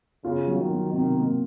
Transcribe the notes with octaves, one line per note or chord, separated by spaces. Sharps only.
C#3 F4
F#3
D#3
F#3
C3 D#3
A#3